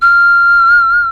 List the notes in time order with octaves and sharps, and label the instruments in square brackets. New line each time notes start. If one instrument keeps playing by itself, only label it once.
[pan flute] F6